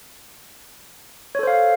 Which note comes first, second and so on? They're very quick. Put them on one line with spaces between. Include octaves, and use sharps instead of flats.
C#5 A4 C5 F5